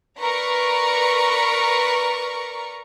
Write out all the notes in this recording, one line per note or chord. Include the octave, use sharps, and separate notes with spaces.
A#4 B4 D5 A#5 C#6